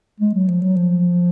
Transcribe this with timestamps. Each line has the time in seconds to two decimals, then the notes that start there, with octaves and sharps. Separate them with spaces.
0.20 G#3
0.34 F#3
0.48 F3
0.61 F#3
0.76 F3